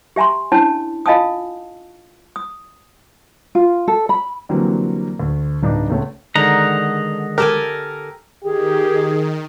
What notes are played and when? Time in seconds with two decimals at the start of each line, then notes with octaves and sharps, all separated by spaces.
0.16 G4 E5 G#5 A#5 C6
0.52 C#4 D4 E4 C#5 A5
1.06 F4 D#5 F5 G#5 A5 D#6
2.36 D#6
3.55 F4
3.88 A4
4.09 B5
4.49 D3 E3 F#3 G3 A#3 C4
5.20 D2
5.63 D1 G2 D4 D#4 D6
5.90 C#2 A3 C#5
6.36 D3 D#3 G#3 D#5 F#5 A#5
7.38 G4 A4 A#4 G#5
8.44 D#3 G4 G#4